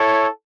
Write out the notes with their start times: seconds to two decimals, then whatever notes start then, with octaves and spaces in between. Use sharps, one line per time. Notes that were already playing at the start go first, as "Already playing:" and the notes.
Already playing: E4 A4 C#5